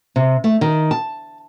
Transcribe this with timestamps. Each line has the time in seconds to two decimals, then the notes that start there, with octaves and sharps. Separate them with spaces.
0.16 C3
0.44 A3
0.61 D#3
0.91 A5